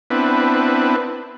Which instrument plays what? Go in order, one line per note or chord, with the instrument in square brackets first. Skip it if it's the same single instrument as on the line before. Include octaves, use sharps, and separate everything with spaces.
[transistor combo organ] B3 C4 D4 E4 B4